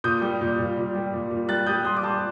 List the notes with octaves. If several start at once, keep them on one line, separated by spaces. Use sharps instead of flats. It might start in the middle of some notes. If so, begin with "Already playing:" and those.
A#2 D#6 G6
G3
A#2
A#2
A#2
G3
A#2
A#2
G3 F#6 A6
G3 D#6 G6
G3 C6 D#6
D6
G3 A5 C6